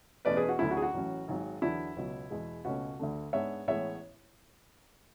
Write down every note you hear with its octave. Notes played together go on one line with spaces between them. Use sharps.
E2 B2 A3 C#4 B4 D5
G#4 B4
F#4
D2 D3 F#3 A3 C#4 E4
F#4
G#4
F#4
A1 A2 F#3 C#4
G#1 G#2 F#3
E2 D3 F#3 B3 D4 E4
C#2 B2 F#3
E2 B2 G#3
C#2 B2 A3 C#4 F#4
D2 D3 A3
G#2 G#3 B3 D4 C#5 E5
A1 A2 G#3 B3 C#5 E5